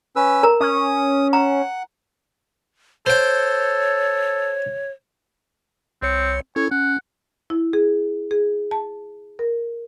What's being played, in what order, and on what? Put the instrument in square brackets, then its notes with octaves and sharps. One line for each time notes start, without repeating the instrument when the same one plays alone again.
[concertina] C#4 B4 E6
[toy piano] A#4 A#5
[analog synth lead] C#4 [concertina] D#6
[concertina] F#5 [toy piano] A#5
[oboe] A4 [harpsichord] C5 G5 [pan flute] C#5
[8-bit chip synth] C2 C#5 C#7 [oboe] C4
[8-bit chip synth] C#4 E4 A4 [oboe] C#5
[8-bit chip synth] C#4 [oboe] F#5
[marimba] E4
G#4
G#4
A5
A#4